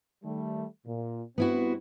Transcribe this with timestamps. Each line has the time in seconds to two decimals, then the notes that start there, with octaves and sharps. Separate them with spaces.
0.24 D#3 G3 A3
0.87 A#2
1.38 G2 B3 C4 E4 F#4